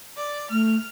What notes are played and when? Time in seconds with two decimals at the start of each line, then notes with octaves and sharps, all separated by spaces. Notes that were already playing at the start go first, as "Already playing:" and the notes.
0.17 D5
0.51 A3 F6